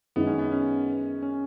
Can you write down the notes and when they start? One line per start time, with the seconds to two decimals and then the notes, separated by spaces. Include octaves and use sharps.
0.16 F#2 D#3 G#3 B3 D#4
0.27 C#4
0.39 B3
0.52 C#4
1.22 C#4